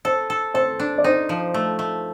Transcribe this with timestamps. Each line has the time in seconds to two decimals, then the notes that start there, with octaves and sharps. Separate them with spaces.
0.05 A4 C5
0.30 A4
0.54 A4 C5
0.80 D4
0.98 D5
1.04 D#4 C5
1.29 F3
1.54 A3
1.79 A3